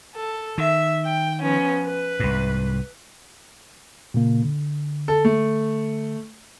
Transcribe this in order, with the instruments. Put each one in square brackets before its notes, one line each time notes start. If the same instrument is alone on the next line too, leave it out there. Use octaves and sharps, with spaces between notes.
[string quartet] A4
[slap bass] D#3 [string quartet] E5
[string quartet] G5
F3 B3 C#4
B4
[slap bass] C2 G#2
[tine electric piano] A#2 C#3 A#3
D3
[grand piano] A4
A3